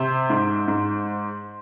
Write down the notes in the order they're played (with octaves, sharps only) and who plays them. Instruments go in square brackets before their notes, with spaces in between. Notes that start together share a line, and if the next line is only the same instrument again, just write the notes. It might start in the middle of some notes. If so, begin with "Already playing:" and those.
Already playing: [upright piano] C3 C5
G#2
G#2